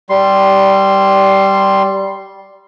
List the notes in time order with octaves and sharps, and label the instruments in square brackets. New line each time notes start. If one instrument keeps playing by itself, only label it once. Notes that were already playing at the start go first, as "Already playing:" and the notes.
[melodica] G3 C6